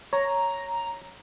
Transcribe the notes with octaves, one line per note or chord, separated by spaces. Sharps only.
C#5 A#5